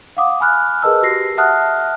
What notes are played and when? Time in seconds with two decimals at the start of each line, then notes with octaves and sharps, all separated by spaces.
0.17 F5 F#5 D6 D#6
0.40 G#5 B5 F6 F#6
0.82 G#4 A#4 B4 D#5 A5 E6
1.02 F#4 G4 A#6 C7
1.37 E5 F#5 A5 D#6 F6 F#6